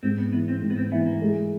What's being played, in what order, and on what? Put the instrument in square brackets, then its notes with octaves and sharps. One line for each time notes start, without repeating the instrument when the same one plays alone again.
[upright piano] G#2 [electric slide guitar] C4
[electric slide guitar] B3
[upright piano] E3 [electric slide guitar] B3
[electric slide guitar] C4
[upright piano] G#2
[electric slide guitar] B3
C4
[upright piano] E3 [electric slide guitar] B3
[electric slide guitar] A#3
[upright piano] G#3